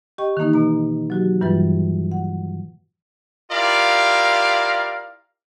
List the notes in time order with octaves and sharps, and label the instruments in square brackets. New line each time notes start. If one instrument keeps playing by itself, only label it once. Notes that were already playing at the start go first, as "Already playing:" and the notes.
[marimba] G4 D#5 G5 C#6
D#3 E3 A#3 D#4
B2 A#5
F#3 F#4 G4
G2 E3 G3 F4 B4 A6
F#5
[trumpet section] E4 F4 G4 A#4 D5 F5